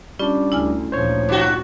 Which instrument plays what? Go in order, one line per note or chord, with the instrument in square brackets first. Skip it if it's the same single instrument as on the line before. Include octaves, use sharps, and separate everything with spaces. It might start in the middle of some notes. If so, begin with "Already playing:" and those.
[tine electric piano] G3 D4 [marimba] C#4 F4
[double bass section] D2 D3 [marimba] E4 G#5 F6
[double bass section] D2 A#2 F3 [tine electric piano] C5 C#5
[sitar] G2 F#4 [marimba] F4 D6